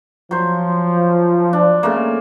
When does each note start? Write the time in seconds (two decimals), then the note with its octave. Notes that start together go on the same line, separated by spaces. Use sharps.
0.31 F3 F#3 C5
1.53 D4
1.83 C#3 A3 A#3